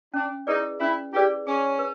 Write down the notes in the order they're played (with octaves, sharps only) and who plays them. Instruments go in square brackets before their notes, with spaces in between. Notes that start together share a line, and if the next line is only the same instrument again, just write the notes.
[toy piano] C#4 [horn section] D4
[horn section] D#4 [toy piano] E4 G#4 B4 D5
[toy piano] C#4 [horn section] E4
[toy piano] E4 G#4 B4 D5 [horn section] G4
[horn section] C#4 [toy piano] G#4
[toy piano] B4